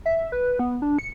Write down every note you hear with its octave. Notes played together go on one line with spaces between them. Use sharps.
E5
B4
B3
D4
C#7